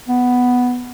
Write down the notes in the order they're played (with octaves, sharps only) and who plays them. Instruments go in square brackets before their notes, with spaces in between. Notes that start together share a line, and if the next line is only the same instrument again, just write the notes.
[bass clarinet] B3